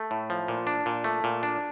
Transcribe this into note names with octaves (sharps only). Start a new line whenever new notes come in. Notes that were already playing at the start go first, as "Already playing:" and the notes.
Already playing: A3
A2
F3
A#2
D4
A#2
A3
A#2
D4